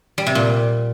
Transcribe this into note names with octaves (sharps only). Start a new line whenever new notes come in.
G3
C3
A#2